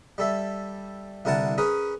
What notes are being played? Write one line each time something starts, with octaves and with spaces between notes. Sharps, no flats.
G3 A4 E5
C2 D3 E4 A#4 F#5 A5
C#4 G#4 A#4 B4